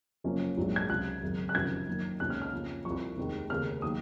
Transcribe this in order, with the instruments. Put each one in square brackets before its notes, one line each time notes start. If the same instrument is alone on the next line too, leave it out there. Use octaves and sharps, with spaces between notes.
[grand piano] F#1 F#2 F3 A#3 C#4
A#1 G#2 F#3 A#3
G#6
C#2 C3 F#3 F#6
G#1 F#2 C#3
F#6
F#1 F2 C3 D#3 F#3 G#6
F#2 D#3 A#3
C#2 C3 D#3 A#3 C#4 F#6
F6
F6
F2 C#3 F3 A#3 C#4
C2 C3 F3 C#6
F1 D#2 D#3 G#3
F1 D#2 C#3 F6
D#3 F#3 A#3 D#6